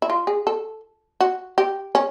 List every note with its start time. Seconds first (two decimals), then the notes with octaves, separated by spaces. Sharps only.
0.02 E4
0.10 F4
0.27 G#4
0.47 A4
1.20 F#4
1.58 G4
1.95 C#4